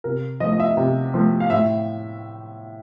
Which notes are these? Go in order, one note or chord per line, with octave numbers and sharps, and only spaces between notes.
C3 A#4
F3 A3 D#5
D#5
E5
C3
F3 A3
F5
A2 E5